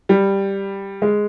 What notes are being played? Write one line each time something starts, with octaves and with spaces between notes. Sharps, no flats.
G3
G#3